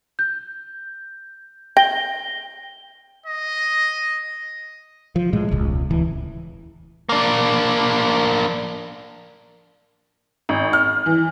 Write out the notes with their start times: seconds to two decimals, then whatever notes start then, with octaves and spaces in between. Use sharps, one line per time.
0.19 G6
1.77 G5 A#6 G7
3.26 D#5
5.16 F3
5.33 A2 G#3
5.51 E1 C#2
5.91 D1 E3
7.09 A#3 D4
10.49 G#1
10.73 F6
11.06 E3